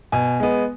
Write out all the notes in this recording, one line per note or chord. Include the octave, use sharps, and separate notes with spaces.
B2 G#5
G#3 B3